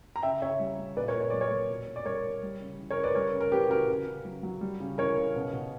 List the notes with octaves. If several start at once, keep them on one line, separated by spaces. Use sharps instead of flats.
A#5
C#3 E5 G5
C#3 C#5 E5
G3
G3
A#2 B4 D5
A#4 C#5
A#2
C#5
F#3 D5
A#4 C#5
F#3
B2
B2
D5
G3 A#4 C#5
G3
G3
C#3
E3
A#4 C#5
C#3
B4 D5
G3 A#4 C#5
C#3
A#4
E3 G4 B4
C#3 F#4 A#4
C#3
C#3
F#3
F#3
G3
C#3
E3 A#4 C#5
C#3
B2
B2